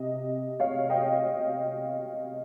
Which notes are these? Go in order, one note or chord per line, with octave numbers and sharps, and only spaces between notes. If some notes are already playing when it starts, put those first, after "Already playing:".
Already playing: C3 D#5
C#5 F5
D#5 G5